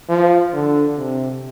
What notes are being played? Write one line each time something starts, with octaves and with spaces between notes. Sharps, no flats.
F3
D3
C3